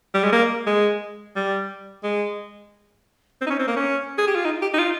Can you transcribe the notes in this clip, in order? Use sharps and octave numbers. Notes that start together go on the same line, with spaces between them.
G3
G#3
A#3
G#3
G3
G#3
C4
D#4
C#4
C4
A#3
C#4
G#4
G4
F4
D#4
G4
D#4
F4